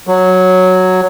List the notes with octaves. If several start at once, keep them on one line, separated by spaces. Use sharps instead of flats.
F#3